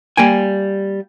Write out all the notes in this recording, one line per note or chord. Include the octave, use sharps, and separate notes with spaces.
G3 A#3 G5 G#5